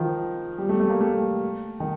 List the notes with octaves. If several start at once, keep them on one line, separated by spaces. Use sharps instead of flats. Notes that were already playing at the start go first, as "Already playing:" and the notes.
Already playing: D#3 F3
G3
A3
A3
A#3
A3
D#3